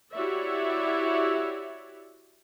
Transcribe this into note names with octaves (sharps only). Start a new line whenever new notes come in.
E4 F#4 G4 C#5 D5 E5